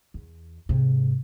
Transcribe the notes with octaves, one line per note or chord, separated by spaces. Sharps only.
E2
G#2 C3